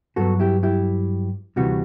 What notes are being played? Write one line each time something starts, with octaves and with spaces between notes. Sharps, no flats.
G2 F#3 B3 F#4 A4
E4 G4
E4 G4
D2 C3 E3 G3 F#4